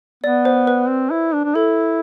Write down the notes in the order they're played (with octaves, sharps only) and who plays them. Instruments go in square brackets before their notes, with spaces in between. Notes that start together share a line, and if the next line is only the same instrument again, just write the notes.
[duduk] B3 [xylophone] D5
[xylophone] C5
B4
[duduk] C4
E4
D4
D4
[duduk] E4 [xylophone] A4